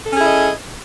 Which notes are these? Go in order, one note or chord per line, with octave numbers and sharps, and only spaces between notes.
C#4 E4 G#4 A4 D#5